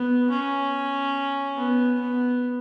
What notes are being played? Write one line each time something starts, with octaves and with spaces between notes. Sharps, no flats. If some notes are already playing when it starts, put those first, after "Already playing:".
Already playing: B3
C#4
B3
B3